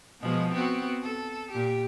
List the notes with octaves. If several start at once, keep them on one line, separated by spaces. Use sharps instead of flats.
B2 F3 G#3
B3 C4 F#4
A4
A#2 G4